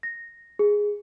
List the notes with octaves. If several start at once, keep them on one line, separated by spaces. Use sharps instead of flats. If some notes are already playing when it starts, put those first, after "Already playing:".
A#6
G#4